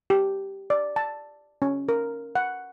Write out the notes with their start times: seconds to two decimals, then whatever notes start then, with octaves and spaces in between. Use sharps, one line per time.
0.10 G4
0.70 D5
0.96 A5
1.62 C#4
1.89 A#4
2.35 F#5